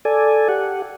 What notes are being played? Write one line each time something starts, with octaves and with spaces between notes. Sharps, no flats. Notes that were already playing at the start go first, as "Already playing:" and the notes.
A4 D5 G#5
G4 F#5